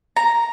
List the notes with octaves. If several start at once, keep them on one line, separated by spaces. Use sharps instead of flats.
A#5